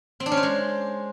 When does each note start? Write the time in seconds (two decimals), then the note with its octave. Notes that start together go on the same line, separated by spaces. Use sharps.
0.20 C4
0.26 D4
0.32 C#4
0.37 C5
0.43 G#3